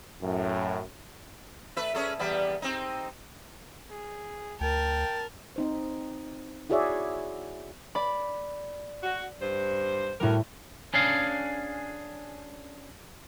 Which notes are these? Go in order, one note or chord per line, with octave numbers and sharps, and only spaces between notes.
F#2 A2
A3 B4 E5
C#4 G#4 A4
E2 G3 B3
C4 D#4
G#4
D2 A#4 G5 A5
C4 D#4 C5
E4 F#4 G#4 C#5 D5 E5
D5 B5
F#4
G2 C5
A2 D3 G3 F#4 A#4
C#4 D4 G#4 F5